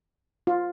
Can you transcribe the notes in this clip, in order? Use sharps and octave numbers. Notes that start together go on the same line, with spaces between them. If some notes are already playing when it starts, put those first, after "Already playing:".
F4